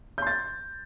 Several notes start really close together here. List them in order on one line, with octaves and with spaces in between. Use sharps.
G6 C6 A6